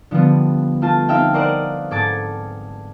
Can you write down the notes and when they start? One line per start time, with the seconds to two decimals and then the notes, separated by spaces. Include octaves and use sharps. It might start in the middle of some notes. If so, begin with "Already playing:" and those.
0.11 D3 F3 G3 B3
0.82 A3 F4 A5
1.09 C4 D#4 E5 F5 G5
1.34 A#4 C5 D5 D#5 F5 F#5
1.91 G#2 G#4 A4 D6 G#6 A6